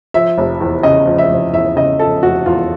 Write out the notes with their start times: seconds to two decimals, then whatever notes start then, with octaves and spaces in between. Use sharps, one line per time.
0.14 F3 E5
0.38 F1
0.61 E2
0.83 C#3 D#5
1.07 F3
1.18 E5
1.30 F1
1.53 E2 E5
1.76 C#3 D#5
1.99 F3 A4
2.23 F1 F#4
2.46 E2 F4